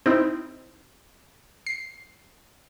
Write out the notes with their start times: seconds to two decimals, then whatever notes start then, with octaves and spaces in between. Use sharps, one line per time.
0.06 C4 D#4 E4
1.67 C7